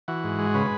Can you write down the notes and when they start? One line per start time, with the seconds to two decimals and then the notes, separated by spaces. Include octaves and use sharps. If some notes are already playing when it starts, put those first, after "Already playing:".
0.08 E3 F#4
0.24 G#2
0.38 G#3
0.54 C#3 B4